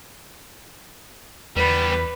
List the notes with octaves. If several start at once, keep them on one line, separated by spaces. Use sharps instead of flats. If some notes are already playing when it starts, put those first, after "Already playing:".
E2 G3 B3 B4